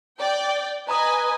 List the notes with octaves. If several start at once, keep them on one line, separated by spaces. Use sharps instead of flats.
D5 G5
B4 D#5 G#5 A#5 D#6